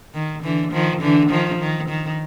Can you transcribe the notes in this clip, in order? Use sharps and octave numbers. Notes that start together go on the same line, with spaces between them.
D#3
D3 E3
D#3 F3
D3 E3
D#3 F3
D#3
D#3